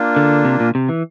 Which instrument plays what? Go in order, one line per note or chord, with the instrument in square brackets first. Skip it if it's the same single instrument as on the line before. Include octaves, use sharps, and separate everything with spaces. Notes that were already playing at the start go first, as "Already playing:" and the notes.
Already playing: [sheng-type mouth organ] A#3 D4 F4
[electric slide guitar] D3
C3
A#2
C3
E3